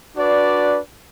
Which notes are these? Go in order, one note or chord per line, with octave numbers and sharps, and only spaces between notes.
D4 F#4 B4 D5